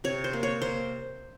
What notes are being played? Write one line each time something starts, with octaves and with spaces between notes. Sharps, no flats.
C3 C#5
C5
A#3
C#5
A#3 C5